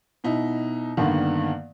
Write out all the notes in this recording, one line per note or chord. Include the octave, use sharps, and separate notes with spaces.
B2 D#4 E4
G2 D3 D#3 A#3 B3